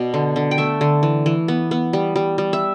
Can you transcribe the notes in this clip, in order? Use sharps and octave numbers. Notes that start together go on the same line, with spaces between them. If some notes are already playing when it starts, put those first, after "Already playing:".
Already playing: B2 B3 D5
D3
D3
G5
A3 E5
D3
E3
E3
B3
B3
G3
G3
G3
E5